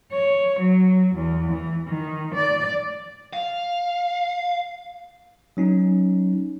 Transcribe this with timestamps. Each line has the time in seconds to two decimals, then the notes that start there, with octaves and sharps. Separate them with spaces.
0.12 C#5
0.59 F#3
1.14 E2
1.52 E3
1.87 D#3
2.34 D5
3.33 F5
5.57 F#3 C#4 D#4